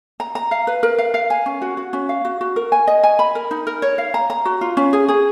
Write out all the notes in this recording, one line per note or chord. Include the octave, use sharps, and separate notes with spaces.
A#5
A#5
F5
B4
A#4
F5
F5
G#5
C#4
F#4
F#4
C#4
F5
F#4
F#4
A#4
G#5
D#5
G#5
B5
A#4
D#4
A#4
C#5
F5
A#5
A#5
F#4
F4
C#4
G#4
G#4